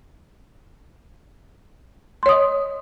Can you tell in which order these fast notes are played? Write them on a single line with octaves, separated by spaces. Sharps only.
C6 C#5 D#6 D#5